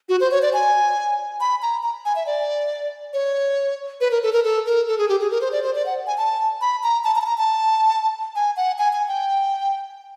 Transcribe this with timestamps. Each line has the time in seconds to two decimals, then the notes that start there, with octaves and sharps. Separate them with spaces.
0.09 F#4
0.21 C5
0.31 C#5
0.42 D5
0.53 G#5
1.41 B5
1.62 A#5
1.83 A#5
2.05 G#5
2.16 E5
2.26 D5
3.13 C#5
4.01 B4
4.11 A#4
4.23 A4
4.33 A#4
4.44 A4
4.66 A#4
4.88 A4
4.98 G#4
5.09 G4
5.20 G#4
5.31 A#4
5.41 C5
5.52 D5
5.63 C5
5.75 D5
5.86 F#5
6.07 G#5
6.18 A5
6.61 B5
6.83 A#5
7.04 A5
7.16 A#5
7.21 A5
7.26 A#5
7.38 A5
8.36 G#5
8.57 F#5
8.78 G#5
8.93 G#5
9.08 G5